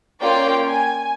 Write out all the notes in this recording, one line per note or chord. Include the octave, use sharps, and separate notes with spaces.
A#3 C#4 F4 D5 G5
G#5